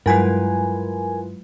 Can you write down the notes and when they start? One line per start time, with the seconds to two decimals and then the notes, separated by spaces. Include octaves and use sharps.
0.06 G2 F#3 G#3 E4 F4 A#4 B4 G#5